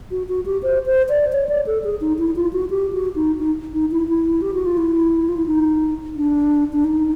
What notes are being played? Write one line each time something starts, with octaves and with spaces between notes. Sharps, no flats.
F#4
F#4
G4
C5
C5
D5
C#5
D5
A4
G#4
D#4
E4
F4
F#4
G4
F#4
D#4
D#4
D#4
E4
E4
G4
F#4
F4
E4
F4
E4
D#4
D4
D4
D#4